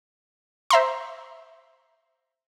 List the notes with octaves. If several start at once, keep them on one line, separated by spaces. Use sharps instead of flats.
C5 E5 A#5 C6